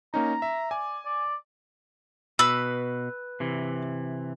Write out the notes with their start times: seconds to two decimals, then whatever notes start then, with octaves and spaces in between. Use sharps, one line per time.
0.14 A#3 C#4 D#4 A#5
0.42 E5
0.71 D5 G#5
1.05 D5
2.39 B2 B4 E6
3.40 C3 E3